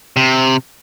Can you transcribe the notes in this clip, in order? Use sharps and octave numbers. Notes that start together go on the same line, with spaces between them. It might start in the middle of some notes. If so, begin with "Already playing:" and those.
C3